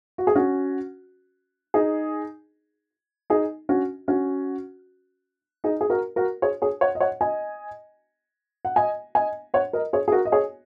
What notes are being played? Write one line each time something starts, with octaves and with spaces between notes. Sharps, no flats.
F#4
G#4
C#4 F#4
D#4 G#4
D#4 G#4
C#4 F#4
C#4 F#4
D#4 G#4
G#4
F#4 A#4
F#4 A#4
G#4 C#5
G#4 C#5
C#5 F#5
D#5
C#5 F#5
D#5 G#5
F#5
D#5 G#5
D#5 G#5
C#5 F#5
A#4 D#5
G#4 C#5
G#4
F#4 A#4
D#5
G#4 C#5